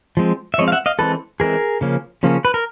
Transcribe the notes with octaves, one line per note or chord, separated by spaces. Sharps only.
F3 G#3 C4
E5
F3 G#3 C4 C#5 D#5
F5
E5 F#5
D#5 F5
E3 G#3 C4 A4 B4
E3 G#3 C4 G#4 A#4
C#3 F3 A#3 C#4
C#3 F3 A#3 C#4
B4
A#4